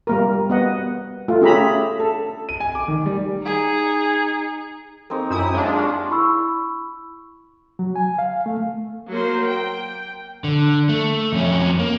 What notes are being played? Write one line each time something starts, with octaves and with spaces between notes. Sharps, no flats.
G3 A#3 A#4
B3 D#5 F#5
A3 F4
C#4 G4 G#4 E5 A#5 B5
A4
D#7
G#5
D6
D#3
G3
D#4 G#4
A#3 C4 D#4 G#4 A4
F#2 D4 E4 A#5 D6 D#6
G#3 D4 C#5 F5 A5
D#4 F4 F5
G4 F5
E4 B5 C#6 E6
F#3
G#5
F5
A3
F#3 A#3 C5
G5
D3
A3
F2 C#4
A#3